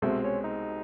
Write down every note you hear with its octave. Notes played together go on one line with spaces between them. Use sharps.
C2 B2 G#3 A3 C4
C#4
D#4